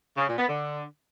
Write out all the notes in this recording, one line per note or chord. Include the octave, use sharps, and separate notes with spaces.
C#3
A#2
B3
D3